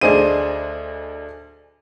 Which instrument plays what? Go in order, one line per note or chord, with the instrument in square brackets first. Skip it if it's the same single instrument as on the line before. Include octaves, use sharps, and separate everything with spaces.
[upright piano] D2 D4 G#4 C5 D#5 D#7